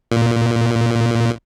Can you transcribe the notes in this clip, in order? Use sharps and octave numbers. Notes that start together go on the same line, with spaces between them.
A#2